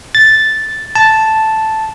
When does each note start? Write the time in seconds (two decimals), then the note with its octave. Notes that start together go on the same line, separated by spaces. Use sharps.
0.15 A6
0.95 A5